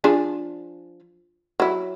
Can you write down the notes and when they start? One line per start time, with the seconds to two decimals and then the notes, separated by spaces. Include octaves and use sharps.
0.04 F3 D4 G#4
1.60 F#3 E4